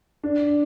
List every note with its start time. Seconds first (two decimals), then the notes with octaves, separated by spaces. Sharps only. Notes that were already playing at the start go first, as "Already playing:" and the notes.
0.23 D4